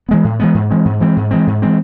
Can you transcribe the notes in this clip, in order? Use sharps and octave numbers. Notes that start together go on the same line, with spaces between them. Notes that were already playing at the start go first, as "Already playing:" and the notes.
E3 G#3 B3
A2
E3 G#3 B3
G#2
E3 G#3 C4
G#2
E3 G#3 C4
G#2
E3 G#3 C4
G#2
E3 G#3 C4